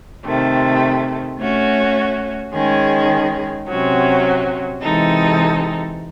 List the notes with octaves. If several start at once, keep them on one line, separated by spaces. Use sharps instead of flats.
C3 D#3 A3
A3 C#4 F#4
D#3 G#3 C#4 G#4
C3 F#3 C#4 F#4
C3 E3 G#3 D#4 A4